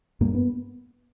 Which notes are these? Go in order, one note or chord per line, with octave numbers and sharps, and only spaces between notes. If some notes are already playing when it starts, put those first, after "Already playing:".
G2 A#3
B3